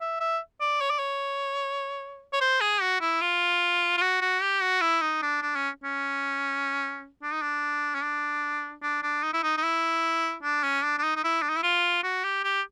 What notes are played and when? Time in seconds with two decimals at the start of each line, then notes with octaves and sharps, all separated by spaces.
0.01 E5
0.20 E5
0.61 D5
0.81 C#5
0.90 D5
0.99 C#5
2.33 C#5
2.41 C5
2.61 G#4
2.81 F#4
3.01 E4
3.21 F4
3.98 F4
4.02 F#4
4.21 F#4
4.41 G4
4.62 F#4
4.81 E4
5.01 D#4
5.22 D4
5.42 D4
5.55 C#4
5.84 C#4
7.22 D4
7.32 D#4
7.42 D4
7.95 C#4
8.03 D4
8.83 D4
9.03 D4
9.23 D#4
9.33 E4
9.43 D#4
9.57 D#4
9.63 E4
10.43 D4
10.63 C#4
10.83 D4
10.98 D4
11.03 D#4
11.16 D#4
11.24 E4
11.42 D4
11.49 D#4
11.56 E4
11.63 F4
12.03 F#4
12.24 G4
12.44 G4